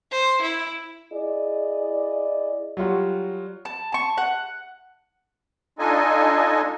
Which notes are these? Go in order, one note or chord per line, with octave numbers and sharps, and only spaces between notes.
C5
E4
E4 G#4 D5 D#5
F#3 G3 F4 F#4
A5
A5 C#6
F#5
D4 D#4 F4 A4 D#5 G#5